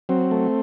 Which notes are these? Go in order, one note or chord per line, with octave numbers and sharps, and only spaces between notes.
F#3 C4
A3